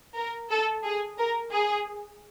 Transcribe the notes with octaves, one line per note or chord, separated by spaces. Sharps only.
A#4
A4
G#4
A#4
G#4